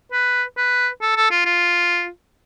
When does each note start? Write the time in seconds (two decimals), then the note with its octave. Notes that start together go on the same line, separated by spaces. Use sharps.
0.12 B4
0.57 B4
1.02 A4
1.16 A4
1.31 F4
1.45 F4